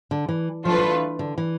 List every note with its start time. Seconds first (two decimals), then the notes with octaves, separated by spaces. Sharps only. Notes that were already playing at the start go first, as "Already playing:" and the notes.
0.11 D3
0.29 E3
0.65 F3 A3 D4 F4 B4
0.78 F3
0.84 E3
1.19 D3
1.38 E3